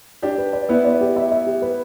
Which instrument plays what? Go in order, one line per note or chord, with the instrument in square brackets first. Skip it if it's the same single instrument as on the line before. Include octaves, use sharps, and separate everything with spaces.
[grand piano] D4 G4 [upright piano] D5
[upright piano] B4
D5
[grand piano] B3 E4 [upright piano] B4
[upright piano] D5
G4
E5
E5
G4
B4